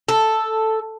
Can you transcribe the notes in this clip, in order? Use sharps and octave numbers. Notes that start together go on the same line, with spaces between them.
A4